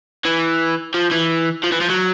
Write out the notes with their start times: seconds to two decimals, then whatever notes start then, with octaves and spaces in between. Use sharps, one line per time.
0.25 E3
0.94 F3
1.11 E3
1.64 F3
1.72 E3
1.81 F3
1.90 F#3